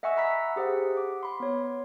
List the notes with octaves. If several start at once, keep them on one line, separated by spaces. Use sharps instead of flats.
D#5 E5 F#5 G#5 C#6 E6
E5 F#5 A#5 B5 E6 B6
G4 G#4 C5 F#5
D6
B5 C6
B3 C#5